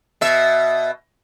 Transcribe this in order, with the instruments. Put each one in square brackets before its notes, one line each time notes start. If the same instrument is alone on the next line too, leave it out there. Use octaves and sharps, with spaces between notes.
[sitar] B2 E5